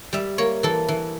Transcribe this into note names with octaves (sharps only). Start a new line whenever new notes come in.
G3 E5
A#3 C#5
E3 A4
E3